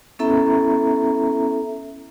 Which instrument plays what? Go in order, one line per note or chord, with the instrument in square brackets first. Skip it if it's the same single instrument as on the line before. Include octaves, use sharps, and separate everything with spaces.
[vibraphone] B3 C#4 E4 A4 E5 A#5